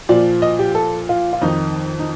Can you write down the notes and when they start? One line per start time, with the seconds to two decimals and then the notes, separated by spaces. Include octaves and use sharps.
0.09 A#2 F3 D5
0.42 D#5
0.59 G4
0.75 A4
1.09 F4
1.33 F4
1.42 F2 D#3 D#4
1.99 D#4